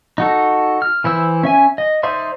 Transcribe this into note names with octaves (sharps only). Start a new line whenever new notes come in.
D#4 F#4 A4
F6
E3 E4 C5 E6
C#4 E5 G#5
D#5
D#4 C5 D5 E5 C6